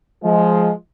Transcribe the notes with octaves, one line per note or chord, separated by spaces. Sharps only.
F3 G#3